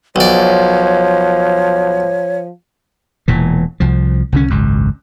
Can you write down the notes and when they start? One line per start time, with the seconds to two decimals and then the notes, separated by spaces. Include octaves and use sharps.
0.16 B1 F3 C#5 D5
3.28 E1 A#2 E3
3.80 C2 F3
4.32 C2 D3 C#4
4.50 G#1 C#2 F#2